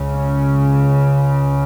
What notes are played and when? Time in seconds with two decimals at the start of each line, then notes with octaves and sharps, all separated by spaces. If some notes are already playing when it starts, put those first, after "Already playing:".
Already playing: C#2 C#3
0.14 C#4